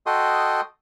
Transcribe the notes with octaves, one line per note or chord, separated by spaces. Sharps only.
F#4 A4 D#5 G5 C6 D#6